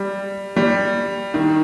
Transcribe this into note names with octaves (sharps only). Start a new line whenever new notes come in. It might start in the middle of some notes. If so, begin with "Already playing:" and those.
Already playing: G3
G3
D#3